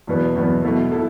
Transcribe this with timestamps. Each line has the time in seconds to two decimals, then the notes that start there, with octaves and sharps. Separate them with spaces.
0.07 E2 B2 B3
0.36 E2 B2 B3
0.63 B2 A3 E4 A4
0.92 E4 A4